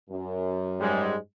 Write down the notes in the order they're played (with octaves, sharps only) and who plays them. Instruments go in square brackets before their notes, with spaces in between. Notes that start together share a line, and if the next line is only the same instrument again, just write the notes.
[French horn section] F#2
[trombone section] G#2 G3 G#3